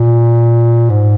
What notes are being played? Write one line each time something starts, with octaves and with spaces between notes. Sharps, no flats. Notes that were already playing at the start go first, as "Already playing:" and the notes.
Already playing: A#2
G#2